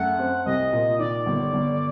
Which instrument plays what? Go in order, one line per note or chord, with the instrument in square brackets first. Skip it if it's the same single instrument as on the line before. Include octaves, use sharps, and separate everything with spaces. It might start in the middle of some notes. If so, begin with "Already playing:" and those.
Already playing: [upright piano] F#2 A3 [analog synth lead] F#5
[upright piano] C4
[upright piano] C2 [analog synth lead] D#5
[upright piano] A#2
[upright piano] D#3 [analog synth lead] D5
[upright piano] G1
G1